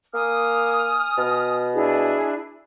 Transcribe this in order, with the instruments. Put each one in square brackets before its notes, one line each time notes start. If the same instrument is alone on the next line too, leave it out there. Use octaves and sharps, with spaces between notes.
[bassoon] A#3 [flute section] G#5 D#6 F6
[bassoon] B2
[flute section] D4 E4 G#4